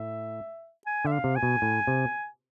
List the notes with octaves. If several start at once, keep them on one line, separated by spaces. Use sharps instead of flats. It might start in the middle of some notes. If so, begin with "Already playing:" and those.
Already playing: A2 E5
G#5
D3 E5
F5
C3
G#5
B2
A2
C3